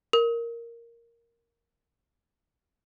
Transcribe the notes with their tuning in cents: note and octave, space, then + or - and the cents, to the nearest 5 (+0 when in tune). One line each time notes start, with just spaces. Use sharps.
A#4 +0